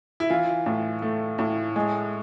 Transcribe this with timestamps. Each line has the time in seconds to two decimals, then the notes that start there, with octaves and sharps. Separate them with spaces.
0.20 E4
0.30 E3 F4
0.66 A2
1.02 A3
1.39 A2
1.76 G#3